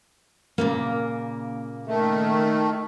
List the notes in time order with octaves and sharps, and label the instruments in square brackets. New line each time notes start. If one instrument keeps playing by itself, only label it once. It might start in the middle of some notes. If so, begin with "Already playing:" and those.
[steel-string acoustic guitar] A#2 C#3 A#3
[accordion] D#3 A3